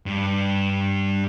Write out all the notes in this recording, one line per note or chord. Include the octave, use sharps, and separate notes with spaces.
G2